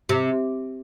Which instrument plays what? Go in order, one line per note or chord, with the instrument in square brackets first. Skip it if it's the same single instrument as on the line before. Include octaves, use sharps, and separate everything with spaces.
[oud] C3